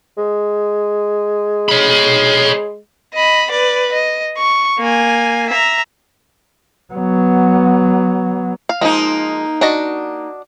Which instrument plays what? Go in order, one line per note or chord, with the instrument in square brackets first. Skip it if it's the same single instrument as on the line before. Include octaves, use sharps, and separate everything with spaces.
[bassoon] G#3
[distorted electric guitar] C#5 B5
[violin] D#5 B5
B4 D5
D#5
C#6
A#3 G#5
E5 A#5
[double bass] F#3 B3
[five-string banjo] F5
[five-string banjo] F3 G#3 [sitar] A#3 D#4
[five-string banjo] D4 F#4 D#5